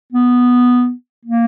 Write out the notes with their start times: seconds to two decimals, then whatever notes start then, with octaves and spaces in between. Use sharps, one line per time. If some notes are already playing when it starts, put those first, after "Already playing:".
0.12 B3
1.25 A#3